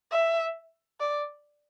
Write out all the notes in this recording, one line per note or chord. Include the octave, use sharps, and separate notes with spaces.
E5
D5